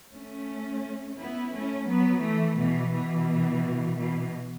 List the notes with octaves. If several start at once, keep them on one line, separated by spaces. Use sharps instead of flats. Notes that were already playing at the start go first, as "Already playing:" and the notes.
A3 C#4
B3 E4
A3 C#4
F#3 B3
E3 A3
B2 E3
B2 E3
B2 E3